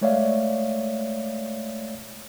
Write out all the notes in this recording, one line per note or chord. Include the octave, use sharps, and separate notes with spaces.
G#3 A3 C#5 D5 E5 F5